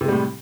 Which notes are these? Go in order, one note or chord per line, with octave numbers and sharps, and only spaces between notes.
A2 C3 G3 G#3